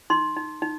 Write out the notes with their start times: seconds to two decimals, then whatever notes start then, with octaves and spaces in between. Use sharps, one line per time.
0.10 D#4 C6
0.37 D#4
0.62 D#4